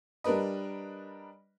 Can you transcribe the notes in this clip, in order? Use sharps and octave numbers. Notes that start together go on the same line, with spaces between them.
G3 D4 A#4 B4 D#5